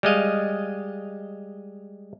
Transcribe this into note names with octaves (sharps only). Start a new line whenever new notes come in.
G3 G#3 D#5 F5